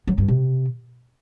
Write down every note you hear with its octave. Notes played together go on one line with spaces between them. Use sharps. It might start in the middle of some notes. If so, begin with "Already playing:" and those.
F#3
G2
C3